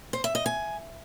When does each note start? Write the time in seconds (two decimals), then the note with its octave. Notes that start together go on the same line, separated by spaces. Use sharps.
0.13 C5
0.24 E5
0.35 D#5
0.46 G#5